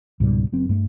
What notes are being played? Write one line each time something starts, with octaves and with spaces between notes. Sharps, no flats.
C#2 G#2 B2 G3
F#1 F#2 C4
G2 A3